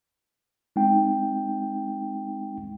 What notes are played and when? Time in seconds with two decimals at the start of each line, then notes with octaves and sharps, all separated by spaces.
0.76 G#3 C4 D#4 G5